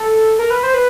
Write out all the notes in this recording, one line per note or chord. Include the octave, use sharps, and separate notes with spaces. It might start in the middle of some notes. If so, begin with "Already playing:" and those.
Already playing: A4
A#4
B4
C5
B4